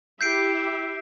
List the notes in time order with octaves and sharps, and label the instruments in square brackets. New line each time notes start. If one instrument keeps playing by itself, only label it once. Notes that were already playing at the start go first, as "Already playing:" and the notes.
[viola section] E4 G4 E5 [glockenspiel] G6 C7 D7